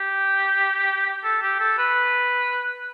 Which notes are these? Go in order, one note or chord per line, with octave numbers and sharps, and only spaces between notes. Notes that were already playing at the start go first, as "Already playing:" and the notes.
Already playing: G4
A4
G4
A4
B4